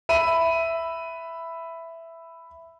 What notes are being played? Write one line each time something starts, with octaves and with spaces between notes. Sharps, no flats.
E5 B5 D#7